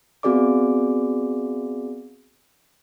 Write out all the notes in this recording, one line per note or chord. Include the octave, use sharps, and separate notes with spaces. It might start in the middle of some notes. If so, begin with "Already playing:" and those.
B3 C4 F#4 G#4 D5 D6